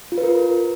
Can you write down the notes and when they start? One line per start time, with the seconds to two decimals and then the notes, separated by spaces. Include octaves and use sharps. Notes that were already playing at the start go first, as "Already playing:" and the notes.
0.12 F4
0.18 B4
0.23 A#4
0.29 B4